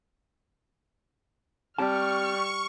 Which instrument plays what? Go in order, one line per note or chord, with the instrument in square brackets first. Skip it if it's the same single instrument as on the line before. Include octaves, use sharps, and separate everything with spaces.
[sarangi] G3 [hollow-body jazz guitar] C4 G4 A5 [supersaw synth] C#6 [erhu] F6